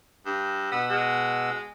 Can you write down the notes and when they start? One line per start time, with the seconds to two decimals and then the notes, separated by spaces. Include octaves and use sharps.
0.26 G2
0.72 B2 B3 F#5 E6
0.89 G#3